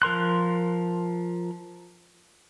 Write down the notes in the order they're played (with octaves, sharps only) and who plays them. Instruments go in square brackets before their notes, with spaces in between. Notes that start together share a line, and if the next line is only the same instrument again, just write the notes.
[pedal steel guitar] F3 A#4 C6 F#6